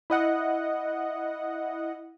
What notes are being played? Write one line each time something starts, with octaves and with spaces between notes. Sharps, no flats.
E4 D#5 F#5